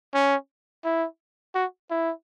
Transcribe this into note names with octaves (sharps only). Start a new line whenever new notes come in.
C#4
E4
F#4
E4